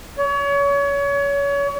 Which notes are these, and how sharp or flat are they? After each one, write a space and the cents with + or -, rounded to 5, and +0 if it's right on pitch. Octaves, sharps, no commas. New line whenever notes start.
C#5 +30